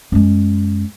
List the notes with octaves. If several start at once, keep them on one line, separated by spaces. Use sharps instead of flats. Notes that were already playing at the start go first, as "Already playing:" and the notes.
F#2 G#3